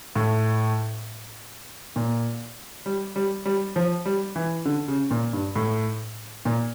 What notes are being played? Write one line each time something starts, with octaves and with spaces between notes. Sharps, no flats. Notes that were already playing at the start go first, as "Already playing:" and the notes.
A2
A#2
G3
G3
G3
F3
G3
E3
D3
C#3
A#2
G2
A2
A#2